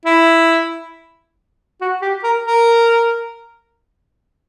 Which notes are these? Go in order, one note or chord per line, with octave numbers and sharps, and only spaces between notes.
E4
F#4
G4
A#4
A#4